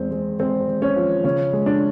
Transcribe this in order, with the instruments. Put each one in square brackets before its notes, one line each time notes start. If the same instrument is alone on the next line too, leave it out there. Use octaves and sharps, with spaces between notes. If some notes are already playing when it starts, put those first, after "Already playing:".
Already playing: [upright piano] E2 G#3 C4
G#3
G#3 C4
G#3
C#4
F3
C#3 C#4
G#3
D4